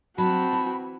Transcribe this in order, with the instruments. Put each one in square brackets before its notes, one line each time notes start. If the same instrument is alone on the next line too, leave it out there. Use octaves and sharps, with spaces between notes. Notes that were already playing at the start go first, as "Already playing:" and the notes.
[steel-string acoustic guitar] F#3 D4 [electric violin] C4 F#4 [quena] A5 [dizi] B5
[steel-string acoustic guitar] E3